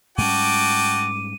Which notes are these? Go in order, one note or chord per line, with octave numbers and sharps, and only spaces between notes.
G#2 G3 C#4 F#4 G5 A5 D6 D#7